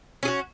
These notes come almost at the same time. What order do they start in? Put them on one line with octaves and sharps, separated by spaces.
C#4 G#4 F#4